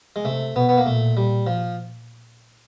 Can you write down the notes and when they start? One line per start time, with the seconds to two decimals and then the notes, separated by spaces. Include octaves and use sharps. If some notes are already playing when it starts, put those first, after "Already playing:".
0.16 G#3
0.25 C3 A3
0.55 B2 B3
0.69 B3
0.77 A#3
0.86 A#2 A3
1.17 G3
1.47 F3